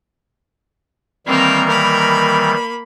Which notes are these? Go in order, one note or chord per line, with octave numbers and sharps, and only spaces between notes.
D#3 E3 G3 A#3 C4 A#4
A#3 A#4 B5